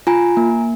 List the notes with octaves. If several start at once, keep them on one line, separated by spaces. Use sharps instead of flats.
F4 G#5 A#5
A#3